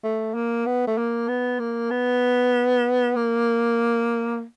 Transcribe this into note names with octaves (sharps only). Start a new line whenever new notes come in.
A3
A#3
B3
A3
A#3
B3
A#3
B3
A#3